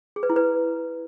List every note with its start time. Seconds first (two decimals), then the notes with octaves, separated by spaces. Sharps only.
0.16 G#4
0.23 B4
0.30 E4
0.36 B4